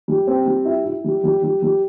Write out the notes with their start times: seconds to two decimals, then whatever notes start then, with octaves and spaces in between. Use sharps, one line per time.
0.08 G3
0.27 C4
0.46 G3
0.65 E4
0.85 E4
1.04 G3
1.24 G3
1.43 G3
1.62 G3